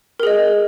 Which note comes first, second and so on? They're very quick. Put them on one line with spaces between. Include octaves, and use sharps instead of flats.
A#4 G#4 D#5